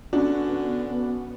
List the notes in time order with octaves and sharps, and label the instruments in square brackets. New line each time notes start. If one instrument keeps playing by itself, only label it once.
[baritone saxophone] D3 [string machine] B3 [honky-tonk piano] C#4 F#4 [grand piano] D4